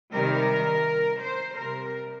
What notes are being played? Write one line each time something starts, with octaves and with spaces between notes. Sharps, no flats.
C3 D#3 G3 A#4
C5
C3 G3 A#4